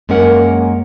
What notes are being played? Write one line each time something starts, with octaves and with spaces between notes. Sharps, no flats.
F#2 G#3 A#3 C#4 A#4 F#5